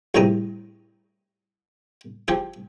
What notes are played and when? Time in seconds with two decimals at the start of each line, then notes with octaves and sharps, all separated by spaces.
0.15 A#1 A2 C3 G3 A#5 D#6
2.28 F3 G4 G#4